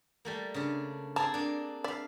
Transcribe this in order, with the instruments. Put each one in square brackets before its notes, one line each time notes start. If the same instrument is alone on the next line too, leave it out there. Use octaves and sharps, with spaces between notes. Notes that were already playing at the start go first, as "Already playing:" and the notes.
[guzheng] G3 A3 A#3
C#3 D4
[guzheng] C4 G#4 D5 [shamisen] A5 A#5
[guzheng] A#3 D4
[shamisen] D5 [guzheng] E5 F5